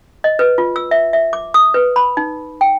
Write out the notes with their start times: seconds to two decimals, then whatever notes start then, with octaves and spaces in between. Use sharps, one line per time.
0.24 D#5
0.39 B4
0.58 F4
0.76 E6
0.91 E5
1.13 E5
1.33 D6
1.54 D#6
1.74 B4
1.96 B5
2.17 D#4
2.61 G5